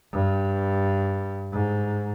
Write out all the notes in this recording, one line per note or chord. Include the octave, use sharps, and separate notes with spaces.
G2
G#2